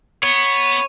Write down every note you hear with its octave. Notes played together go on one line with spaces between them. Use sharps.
B3 C#5